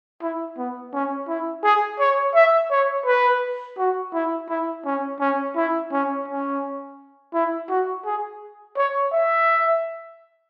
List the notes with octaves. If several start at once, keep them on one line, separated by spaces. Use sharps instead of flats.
E4
B3
C#4
E4
G#4
C#5
E5
C#5
B4
F#4
E4
E4
C#4
C#4
E4
C#4
C#4
E4
F#4
G#4
C#5
E5